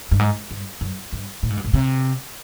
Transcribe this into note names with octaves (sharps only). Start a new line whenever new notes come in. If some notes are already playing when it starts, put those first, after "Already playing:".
G2
G#2
G2
F#2
G2
A2
G#2
G2
G#2
C3